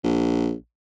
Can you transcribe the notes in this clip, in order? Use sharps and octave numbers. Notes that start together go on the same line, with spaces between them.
A#1